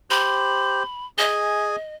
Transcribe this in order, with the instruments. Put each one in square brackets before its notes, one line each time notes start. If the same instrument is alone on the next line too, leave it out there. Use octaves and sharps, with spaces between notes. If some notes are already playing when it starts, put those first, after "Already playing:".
[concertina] G4 C5 [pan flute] B5
[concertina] G#4 G#5 [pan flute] D#5